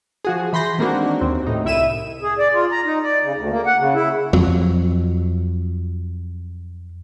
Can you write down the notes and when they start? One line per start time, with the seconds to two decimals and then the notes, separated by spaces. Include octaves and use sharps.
0.25 F3 F#4 G#4
0.53 E3 B5 C6 G6 A#6
0.78 D#3 G#3 A#3 C4 D4 F#4
1.21 D#2 C4
1.46 A2 D#4
1.65 C2 E4 E5 E6 D#7 E7
2.22 G#4
2.39 D5
2.54 F4
2.72 A#5
2.85 D#4
3.02 D5
3.22 C#3
3.35 D2
3.50 A#3
3.66 F#5
3.78 C#3
3.94 E4
4.33 F2 F#3